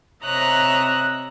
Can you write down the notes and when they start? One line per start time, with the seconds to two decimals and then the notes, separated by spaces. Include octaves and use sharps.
0.25 C3 C#5 D#5 E5 A#5 F#6